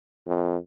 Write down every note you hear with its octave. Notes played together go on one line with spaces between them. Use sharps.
F2